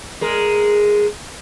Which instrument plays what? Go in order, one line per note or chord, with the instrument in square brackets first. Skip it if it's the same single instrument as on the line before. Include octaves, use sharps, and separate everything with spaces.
[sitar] G#3 A#4